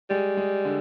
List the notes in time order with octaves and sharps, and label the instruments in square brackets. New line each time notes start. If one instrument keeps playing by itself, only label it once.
[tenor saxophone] G3 [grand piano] G#3
[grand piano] G#3
D3